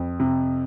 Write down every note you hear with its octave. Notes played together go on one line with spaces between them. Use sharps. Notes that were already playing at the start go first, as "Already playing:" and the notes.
Already playing: F2
C3